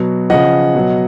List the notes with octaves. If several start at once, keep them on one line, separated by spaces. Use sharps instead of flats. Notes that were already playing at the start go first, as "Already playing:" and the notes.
Already playing: B2 F#3
C#3 F3 D#5 F#5
B2 F#3